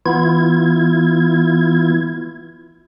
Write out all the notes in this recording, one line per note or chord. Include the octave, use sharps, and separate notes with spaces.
E3 B3 E4 F4 G#6